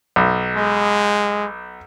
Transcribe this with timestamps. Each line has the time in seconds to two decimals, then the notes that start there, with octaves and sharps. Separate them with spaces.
0.16 B1
0.56 G#3